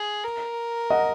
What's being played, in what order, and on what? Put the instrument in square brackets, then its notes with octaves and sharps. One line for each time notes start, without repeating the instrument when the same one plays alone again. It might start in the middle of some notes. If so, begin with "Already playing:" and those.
Already playing: [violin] G#4
A#4
[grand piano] D#5 F#5